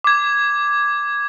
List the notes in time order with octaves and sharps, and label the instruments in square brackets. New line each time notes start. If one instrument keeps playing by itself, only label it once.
[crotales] D6 G#6